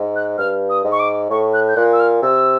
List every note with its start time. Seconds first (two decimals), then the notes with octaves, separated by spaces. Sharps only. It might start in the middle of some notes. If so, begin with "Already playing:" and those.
Already playing: G#2
0.16 F#6
0.38 G2 F6
0.70 D#6
0.84 G#2
0.92 C#6
1.00 D6
1.30 A2 C#6
1.54 F#6
1.69 G6
1.76 A#2 F#6
1.93 E6
2.00 F6
2.23 C3 E6